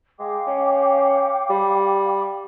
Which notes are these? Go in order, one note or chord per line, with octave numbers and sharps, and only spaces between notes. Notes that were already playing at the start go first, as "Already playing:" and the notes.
G#3 F5 G5 D6
C#4
G3